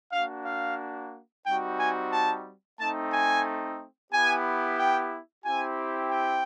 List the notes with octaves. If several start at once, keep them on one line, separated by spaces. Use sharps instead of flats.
A#3 D4 F#4 F5
F5
G3 C4 D#4 F#4 G5
G#5
A5
A3 C4 D#4 A5
G#5
B3 E4 G4 G#5
G5
C4 E4 G4 G#5
G5